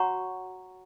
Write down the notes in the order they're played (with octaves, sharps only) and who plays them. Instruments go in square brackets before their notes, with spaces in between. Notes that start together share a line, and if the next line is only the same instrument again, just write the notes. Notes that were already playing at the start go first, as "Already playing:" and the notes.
Already playing: [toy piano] F#4 C#5 F#5 A#5 C#6